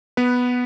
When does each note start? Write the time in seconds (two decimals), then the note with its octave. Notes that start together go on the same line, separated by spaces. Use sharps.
0.17 B3 B4